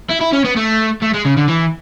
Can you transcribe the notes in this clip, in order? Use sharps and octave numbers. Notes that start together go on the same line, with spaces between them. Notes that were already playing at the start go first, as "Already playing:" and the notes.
E4
E4
C#4
B3
A3
A3
G#3
C#3
D3
E3